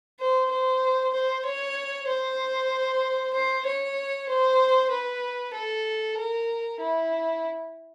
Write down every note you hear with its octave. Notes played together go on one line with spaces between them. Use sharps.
C5
C5
C5
C#5
C5
C5
C#5
C5
B4
A4
A#4
E4